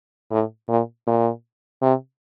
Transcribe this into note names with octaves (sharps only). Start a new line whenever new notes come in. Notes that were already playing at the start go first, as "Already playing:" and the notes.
A2
A#2
A#2
C3